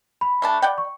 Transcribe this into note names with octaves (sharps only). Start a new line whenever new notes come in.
B5
A3 D4 A5
D5 F#5 G5
C#6